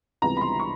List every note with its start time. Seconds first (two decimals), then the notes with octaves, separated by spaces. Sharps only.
0.22 C#2 C3 E3 G3 B3 A#5
0.37 B5
0.41 C6
0.59 C#6